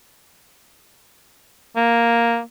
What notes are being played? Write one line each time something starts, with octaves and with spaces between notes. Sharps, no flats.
A#3